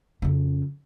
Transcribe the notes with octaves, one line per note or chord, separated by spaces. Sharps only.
F2 C#3